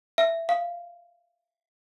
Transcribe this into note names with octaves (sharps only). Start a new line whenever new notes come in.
E5
F5